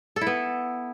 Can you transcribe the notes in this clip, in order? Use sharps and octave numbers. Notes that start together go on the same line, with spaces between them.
A4
E4
B3